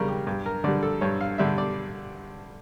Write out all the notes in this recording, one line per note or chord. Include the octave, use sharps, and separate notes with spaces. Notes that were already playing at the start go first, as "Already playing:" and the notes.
Already playing: E2 C#3 G3 A#4
G4
G2 G4
A#4
D3 G3 D5
A4
G2 C#5
F5
D3 G3 E5
D5